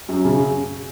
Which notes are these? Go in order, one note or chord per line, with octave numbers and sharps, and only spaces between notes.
F#2
C#3